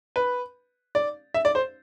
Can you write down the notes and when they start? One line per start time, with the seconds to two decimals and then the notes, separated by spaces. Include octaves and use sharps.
0.16 B4
0.95 D5
1.34 E5
1.45 D5
1.55 C5